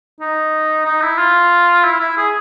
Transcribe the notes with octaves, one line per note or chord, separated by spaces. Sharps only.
D#4
D#4
E4
F4
E4
E4
G#4